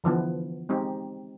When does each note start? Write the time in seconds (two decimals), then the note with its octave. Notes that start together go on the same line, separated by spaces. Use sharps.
0.04 D3 E3 F3 B3
0.69 G#3 C4 D#4 G4